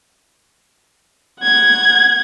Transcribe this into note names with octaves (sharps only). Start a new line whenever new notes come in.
F#5 G#6